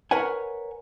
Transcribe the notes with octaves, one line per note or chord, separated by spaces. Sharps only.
A#4 B4 C#5 F#5 G#5